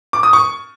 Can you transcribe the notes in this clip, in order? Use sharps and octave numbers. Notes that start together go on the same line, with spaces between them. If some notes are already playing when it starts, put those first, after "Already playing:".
D6
D#6
C#6